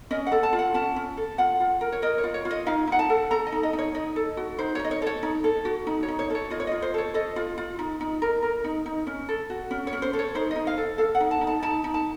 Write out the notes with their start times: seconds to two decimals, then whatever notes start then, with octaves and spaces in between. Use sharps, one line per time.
0.11 C#4 D#5
0.27 F#5
0.32 A4
0.43 A5
0.53 F4
0.59 F#5
0.74 C#4 A5
0.96 C#4
1.17 A4
1.38 F4 F#5
1.60 F4
1.81 A#4
1.92 C#5
2.02 A#4 D#5
2.18 C#5
2.24 F4
2.34 C#5
2.45 F4
2.51 D#5
2.67 D#4 F5
2.87 D#4 F#5
2.99 A5
3.10 A4
3.31 A4 A#5
3.47 D#5
3.52 D#4
3.63 D#5
3.73 D#4
3.79 C#5
3.95 D#4 D#5
4.16 A4
4.37 F#4
4.59 D#4 C5
4.75 D#4 C#5
4.85 D#5
4.91 C#5
5.02 A4 C#5
5.23 D#4
5.44 A4
5.65 F#4
5.87 D#4
6.03 C#5
6.08 D#4
6.19 C#5
6.30 A4 C#5
6.50 F4 D#5
6.60 C#5
6.67 F4 D#5
6.82 C5
6.94 A4 C#5
7.14 A4 D#5
7.36 F4
7.58 F4
7.79 D#4
8.01 D#4
8.22 A#4
8.42 A#4
8.64 D#4
8.86 D#4
9.07 C#4
9.29 A4
9.50 F#4
9.71 C#4
9.87 C#5
9.93 C#4
10.02 C5
10.13 A4
10.19 C#5
10.35 D#4 C5
10.51 D#4 D#5
10.67 F5
10.77 A4
10.98 A4 F5
11.15 F#5
11.20 D#4
11.31 A5
11.41 D#4
11.47 A5
11.62 D#4 A5
11.84 D#4
11.94 A5